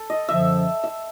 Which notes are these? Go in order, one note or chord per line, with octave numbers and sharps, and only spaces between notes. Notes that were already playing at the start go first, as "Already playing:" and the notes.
Already playing: A4
D#5
F#2 D3 F3 E5
E5